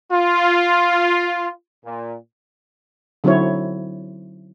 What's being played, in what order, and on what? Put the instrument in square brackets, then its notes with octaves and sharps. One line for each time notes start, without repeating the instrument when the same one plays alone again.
[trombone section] F4
A#2
[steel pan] D3 F#3 C4 D#4 E4 C#5